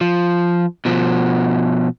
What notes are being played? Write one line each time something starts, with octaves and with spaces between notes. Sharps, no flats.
F3
B2 F3